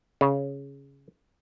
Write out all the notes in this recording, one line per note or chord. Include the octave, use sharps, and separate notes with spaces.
C#3